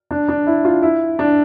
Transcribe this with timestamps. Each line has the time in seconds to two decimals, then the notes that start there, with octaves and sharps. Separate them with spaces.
0.11 D4
0.28 D4
0.47 E4
0.65 F4
0.82 E4
1.19 D4